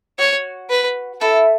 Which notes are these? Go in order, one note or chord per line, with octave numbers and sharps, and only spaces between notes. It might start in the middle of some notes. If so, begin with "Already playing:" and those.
F#4 C#5
B4
E4 A4